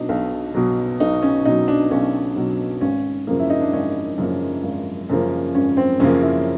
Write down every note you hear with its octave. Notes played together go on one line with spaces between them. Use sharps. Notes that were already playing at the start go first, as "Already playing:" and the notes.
Already playing: B2 F#3 D4 D#4
B1
B2 F#3
B1 D#4
C#4
B2 F#3 D#4
D4
B1 C#4
B2 F#3
G#1 C#4
F#2 C#3 F3 A#3
E4
D#4
D4
G#1 C#4
F#2 C#3 F3 A#3
G#1
F#2 C#3 F3 A#3
G#1 C#4
C4
F#2 C#3 F3 A#3 C#4
E4